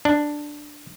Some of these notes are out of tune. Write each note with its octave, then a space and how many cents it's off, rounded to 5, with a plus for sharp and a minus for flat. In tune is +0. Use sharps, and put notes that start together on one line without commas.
D4 +5